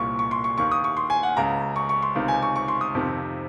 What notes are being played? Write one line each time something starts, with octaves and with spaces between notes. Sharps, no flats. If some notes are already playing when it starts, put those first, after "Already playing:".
Already playing: C2 A#2 C#6
C#6
C6
C#6
D#2 D#3 C#6
D#6
C#6
C6
G#5
F#5
C#2 C#3 A#5
C#6
C#6
C6
C#2 C3 D#3
G#5
C#6
C#6
C6
D#6
F2 C3 D#3